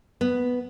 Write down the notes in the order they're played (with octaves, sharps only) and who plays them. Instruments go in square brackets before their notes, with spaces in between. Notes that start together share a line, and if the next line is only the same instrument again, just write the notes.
[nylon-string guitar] B3